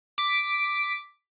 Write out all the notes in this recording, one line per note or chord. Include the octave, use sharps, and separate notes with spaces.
D6 B6